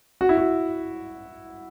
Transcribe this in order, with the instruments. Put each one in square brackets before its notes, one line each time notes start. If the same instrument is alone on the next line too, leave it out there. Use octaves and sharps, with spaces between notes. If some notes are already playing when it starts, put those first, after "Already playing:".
[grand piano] F#4
E4
F#4